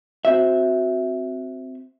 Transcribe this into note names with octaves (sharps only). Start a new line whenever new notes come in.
C4 F#4 E5